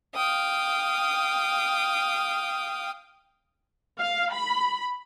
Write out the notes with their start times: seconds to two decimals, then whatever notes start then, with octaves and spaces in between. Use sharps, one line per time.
0.15 F5 G5 D#6
3.99 F5
4.34 B5